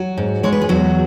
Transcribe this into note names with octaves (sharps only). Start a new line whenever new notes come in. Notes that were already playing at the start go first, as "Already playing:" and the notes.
Already playing: F#3 F#4
G#2
G#3 C#5
B4
G#4
E2 F#3 F#4